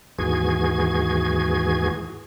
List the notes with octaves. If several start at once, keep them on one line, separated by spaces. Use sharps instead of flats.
D#2 G#2 E3 F#4 G#4 G#6